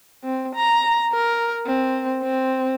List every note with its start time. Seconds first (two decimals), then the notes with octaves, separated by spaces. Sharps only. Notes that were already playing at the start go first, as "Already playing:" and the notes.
0.24 C4
0.56 A#5
1.13 A#4
1.66 C4
2.22 C4